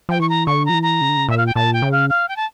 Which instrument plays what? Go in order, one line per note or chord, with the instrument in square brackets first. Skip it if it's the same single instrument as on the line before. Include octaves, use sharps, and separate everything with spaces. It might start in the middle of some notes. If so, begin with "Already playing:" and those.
[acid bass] F3 [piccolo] G5
[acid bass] E3 [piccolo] C#6
[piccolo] A#5
[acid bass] D3 [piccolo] C#6
[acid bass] F3 [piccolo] A#5
[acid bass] E3
[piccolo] A#5
[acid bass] C#3
D3
C#3
[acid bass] A#2 [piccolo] E5
[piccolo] F5
G5
[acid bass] A#2 [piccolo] A5
[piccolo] G5
[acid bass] C#3
[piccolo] F5
F5
G5
A5